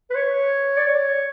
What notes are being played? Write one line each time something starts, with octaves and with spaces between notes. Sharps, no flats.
B4
C#5
D5
C#5